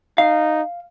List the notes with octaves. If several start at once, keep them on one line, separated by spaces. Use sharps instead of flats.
D#4 F5